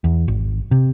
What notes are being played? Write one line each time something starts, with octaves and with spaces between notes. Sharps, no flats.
E2
G#1
C3